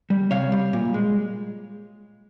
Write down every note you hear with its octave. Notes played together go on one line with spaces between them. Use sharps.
G3
C3 C#5 F5
G3
A#2
G#3